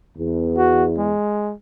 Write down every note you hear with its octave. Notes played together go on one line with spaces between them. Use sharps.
E2
F#4
G#3